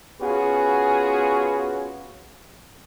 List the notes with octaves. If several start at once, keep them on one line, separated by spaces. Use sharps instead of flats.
B3 C#4 F4 F#4 G#4